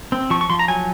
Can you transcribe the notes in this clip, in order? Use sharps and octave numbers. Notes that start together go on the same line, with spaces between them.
C4
F3 C#6
C#6
F3 C6
A#5
F#3 G#5